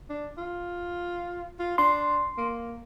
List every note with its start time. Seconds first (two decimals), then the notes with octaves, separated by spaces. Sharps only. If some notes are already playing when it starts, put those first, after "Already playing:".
0.09 D4
0.37 F4
1.59 F4
1.78 D4 C6
2.37 A#3